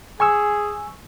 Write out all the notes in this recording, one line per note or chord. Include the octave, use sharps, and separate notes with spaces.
G#4 G#5 C#6 E6